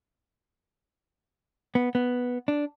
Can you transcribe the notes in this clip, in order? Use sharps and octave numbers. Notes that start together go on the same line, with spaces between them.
B3
B3
D4